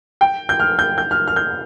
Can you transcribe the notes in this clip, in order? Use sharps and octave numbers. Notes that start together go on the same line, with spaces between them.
G5
G6
F6
G6
G6
F6
F6
G6